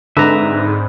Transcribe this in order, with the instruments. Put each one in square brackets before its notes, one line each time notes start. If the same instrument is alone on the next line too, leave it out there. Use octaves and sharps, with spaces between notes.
[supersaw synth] G#2 [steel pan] D3 [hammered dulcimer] C4 B4 D5 [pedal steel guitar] E5 A#5